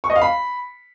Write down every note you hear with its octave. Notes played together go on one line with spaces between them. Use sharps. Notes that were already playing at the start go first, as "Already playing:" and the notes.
C#6
D#5
F5
B5